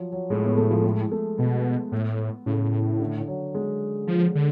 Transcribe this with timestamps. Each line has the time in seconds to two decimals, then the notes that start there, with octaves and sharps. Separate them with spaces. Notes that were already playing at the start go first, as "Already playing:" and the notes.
Already playing: F3 F#3
0.12 F#3
0.30 A2 G#3
0.43 B3
0.57 A3
0.71 F3
0.84 G#3
1.11 A3
1.38 B2 B3
1.92 A2
2.46 A2 C#3
2.99 D3
3.28 F#3
3.54 G#3
4.07 F3
4.35 D3